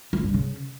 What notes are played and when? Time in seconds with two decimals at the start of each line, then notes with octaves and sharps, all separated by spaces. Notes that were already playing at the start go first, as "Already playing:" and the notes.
0.13 F3
0.24 G2
0.34 C#3